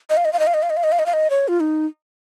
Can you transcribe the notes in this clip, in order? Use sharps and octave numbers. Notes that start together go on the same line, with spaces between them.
D#5
F5
D#5
F5
D#5
F5
D#5
F5
D#5
F5
D#5
F5
D#5
F5
D#5
C#5
F4
D#4